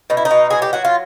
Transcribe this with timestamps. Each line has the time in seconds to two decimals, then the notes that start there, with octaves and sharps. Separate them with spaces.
0.10 B2 D#4
0.17 E4
0.25 D#4
0.31 B2
0.51 F#3 G#4
0.62 G4
0.73 F#3 F#4
0.85 F4